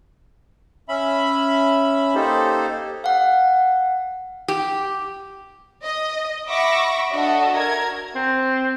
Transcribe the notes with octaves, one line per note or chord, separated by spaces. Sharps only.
C#4 E5 B5
A#3 D#4 G4 A4 C5
F5 F#5
G4
D#5
E5 F#5 B5 C#6 D6 A#6
D4 F#4 A4 D#5 E5
A#4 G#6
C4